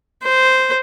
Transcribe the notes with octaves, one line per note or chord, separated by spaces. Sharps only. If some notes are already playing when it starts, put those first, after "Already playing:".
C5